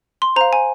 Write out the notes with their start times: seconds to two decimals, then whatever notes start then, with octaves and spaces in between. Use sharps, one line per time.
0.22 C6
0.36 C5 F5 A#5
0.53 G#5